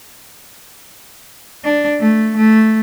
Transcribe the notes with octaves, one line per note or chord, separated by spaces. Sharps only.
D4
A3
A3